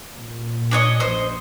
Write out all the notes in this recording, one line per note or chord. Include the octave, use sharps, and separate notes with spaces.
A#2
D4 C#5 D#5
A#1 F#2 C5 D#5